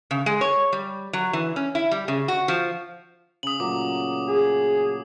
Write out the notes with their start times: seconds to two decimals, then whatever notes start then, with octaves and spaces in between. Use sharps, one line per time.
0.11 C#3
0.26 G#3
0.41 C#5
0.73 G3
1.13 F#3
1.33 E3
1.56 C#4
1.75 E4
1.91 G3
2.08 C#3
2.28 F#4
2.48 F3
3.43 C#3 D#6 F#7
3.60 A#2 F#3 A3 D6
4.28 G#4